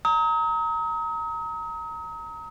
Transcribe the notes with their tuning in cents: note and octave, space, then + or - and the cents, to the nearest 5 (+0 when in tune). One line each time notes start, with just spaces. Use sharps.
A#5 -15 D#6 +40